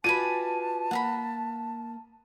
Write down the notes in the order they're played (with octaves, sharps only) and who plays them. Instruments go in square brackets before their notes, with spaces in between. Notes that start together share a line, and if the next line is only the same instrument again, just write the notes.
[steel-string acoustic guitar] F4 F#4 B4 [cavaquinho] D5 G#5 B5 [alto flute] A5 [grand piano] D#7
[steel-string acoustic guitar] A#3 [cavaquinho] F#5 A#5 B5